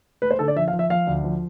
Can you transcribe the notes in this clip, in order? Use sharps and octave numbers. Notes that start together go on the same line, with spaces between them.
A3 B4
C5
D3 A4
D5
F3 E5
F5
F3
E5
F3 F5
D2
F3